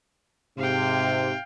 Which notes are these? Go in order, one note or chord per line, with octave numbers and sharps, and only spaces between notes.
G#2 C3 F5 G5